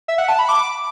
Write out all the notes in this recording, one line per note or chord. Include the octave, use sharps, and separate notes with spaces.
E5
F#5
A5
B5
D6